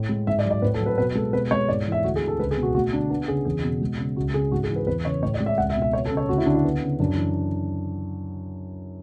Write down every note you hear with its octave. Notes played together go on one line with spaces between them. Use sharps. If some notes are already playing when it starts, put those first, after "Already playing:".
Already playing: A2
G#3
G#2 E5
D5
F#3
D5
A2 B4
A4
F#3
B4
B2 B4
G#3 A4
B2 B4
G#3 C#5
G#2 D5
E3
E5
D2 F#4
G#4
D3
A4
C#2 B4
G#4
B2
F#4
A3 F#4
D3 D4
B3 D4
C#3 G#4
E2 G#4
B2
G#3
C#3
C#2 F#4
C#3 G#4
G#2 F#4
G#4
E3
B4
E2 B4
C#3 C#5
A2 C#5
D5
G#3
E5
C#2 F#5
E5
B2
E5
B3 C#5
A4
C#3
C#5
D2 F#4
E4
D3 D4
E4
B3
C#3
F#2 D4
E3